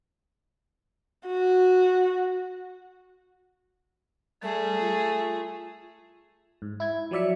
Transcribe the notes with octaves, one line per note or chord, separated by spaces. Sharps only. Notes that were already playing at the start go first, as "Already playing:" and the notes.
F#4
G3 A3 G#4
F4
G#2
E4 G#6
F3 F#3 D5 E5 C#7